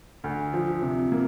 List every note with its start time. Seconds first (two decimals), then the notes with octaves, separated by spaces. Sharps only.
0.24 D2
0.53 F3
0.82 C3
1.12 A#3